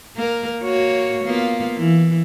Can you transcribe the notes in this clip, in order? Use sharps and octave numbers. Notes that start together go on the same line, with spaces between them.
A#3 A#4
A#3 F#4 C#5
A#3 B3 F4
E3